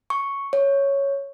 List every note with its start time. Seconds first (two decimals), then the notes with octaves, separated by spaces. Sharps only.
0.10 C#6
0.53 C#5